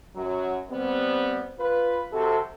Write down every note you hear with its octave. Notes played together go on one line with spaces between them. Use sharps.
F#2 F#3
G3 B3 C4
F4 B4
C3 F#4 A4